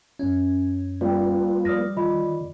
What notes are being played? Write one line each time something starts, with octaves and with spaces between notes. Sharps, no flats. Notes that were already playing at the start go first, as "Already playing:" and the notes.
F#2 C#4
G3 A#3 F4 B4 D5 G5
F2 D5 D#6 F6 A#6
D#3 F4 D#5 B5